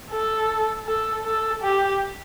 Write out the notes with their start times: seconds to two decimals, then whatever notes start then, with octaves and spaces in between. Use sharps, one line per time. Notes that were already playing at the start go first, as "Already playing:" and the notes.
0.11 A4
0.86 A4
1.24 A4
1.63 G4